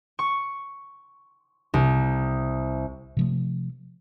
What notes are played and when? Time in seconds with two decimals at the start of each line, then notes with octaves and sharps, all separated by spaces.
0.19 C#6
1.74 C2
3.17 C3 F3 A3